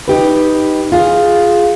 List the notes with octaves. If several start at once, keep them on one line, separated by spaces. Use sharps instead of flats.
D#4 G4 B4
F4 G#4